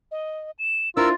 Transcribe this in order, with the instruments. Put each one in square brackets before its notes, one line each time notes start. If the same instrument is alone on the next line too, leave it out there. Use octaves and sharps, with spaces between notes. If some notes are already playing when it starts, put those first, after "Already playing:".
[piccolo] D#5
E7
[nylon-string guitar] D4 E4 C5 [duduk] F4 [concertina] A#4 E6 [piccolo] A6